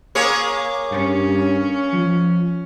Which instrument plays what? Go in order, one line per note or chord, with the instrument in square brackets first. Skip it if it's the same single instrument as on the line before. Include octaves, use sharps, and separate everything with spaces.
[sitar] A#3 G#4 C#5
[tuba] G2 [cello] C#4
[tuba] F3